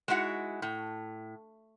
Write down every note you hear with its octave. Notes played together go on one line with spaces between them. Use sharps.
G#3 D#4 E4 F#4 F#5
A2